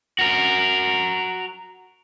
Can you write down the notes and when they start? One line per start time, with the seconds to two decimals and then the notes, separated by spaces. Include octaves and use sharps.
0.19 F#4 A#4